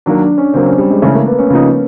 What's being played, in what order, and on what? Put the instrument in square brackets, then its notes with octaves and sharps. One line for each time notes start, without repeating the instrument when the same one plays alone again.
[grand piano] D#3 F#3 A#3 [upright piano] D4
[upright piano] D4
C#4
[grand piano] C#3 F#3 A#3 [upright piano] C4
[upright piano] C#4
G3
G#3
[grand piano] C#3 E3 G#3 C#4 E4 [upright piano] A3
[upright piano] A#3
B3
C#4
[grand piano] C#3 F3 A#3 D#4